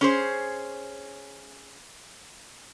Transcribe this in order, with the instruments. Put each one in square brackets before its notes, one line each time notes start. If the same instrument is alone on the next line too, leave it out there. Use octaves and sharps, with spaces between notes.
[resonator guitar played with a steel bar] C#4 G#4 C5